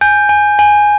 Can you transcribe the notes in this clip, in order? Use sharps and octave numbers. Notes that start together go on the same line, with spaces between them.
G#5 G6
G#5
G#5